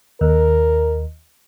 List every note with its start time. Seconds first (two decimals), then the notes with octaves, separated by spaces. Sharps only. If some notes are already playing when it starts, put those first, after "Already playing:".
0.21 D#2 A#4